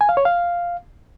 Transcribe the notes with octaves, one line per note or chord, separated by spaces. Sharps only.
G#5
F5
C#5
F5